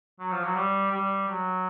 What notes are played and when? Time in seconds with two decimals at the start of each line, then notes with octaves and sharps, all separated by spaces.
0.20 F#3
0.32 F3
0.44 F#3
0.56 G3
0.92 G3
1.29 F#3